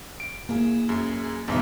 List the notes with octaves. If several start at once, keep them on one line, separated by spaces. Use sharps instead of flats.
D7
A#3 E4 G#4
F#2 G#4 B4
A1 D2 G#2 B2 D#4 E5